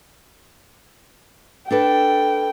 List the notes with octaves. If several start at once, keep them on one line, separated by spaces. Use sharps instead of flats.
D4 A4 B4 G5